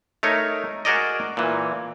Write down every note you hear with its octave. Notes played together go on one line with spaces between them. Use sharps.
A3 D#4 A#4 C#5
F#4 G#4 A#4 D5 D#5
A#2 E3